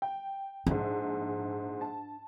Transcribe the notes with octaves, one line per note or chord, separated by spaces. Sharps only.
G5
A#1 G#2 D4
A5